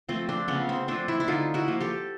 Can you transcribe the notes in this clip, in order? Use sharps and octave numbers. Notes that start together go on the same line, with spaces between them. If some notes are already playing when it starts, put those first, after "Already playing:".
F3 A3 C4
C4 D4
C#3 B3 C#4
C4
F3 A3 C4 D4
D4 E4
E4
D3 D#4 F4
E4 F#4
F3 A#3
G4 A4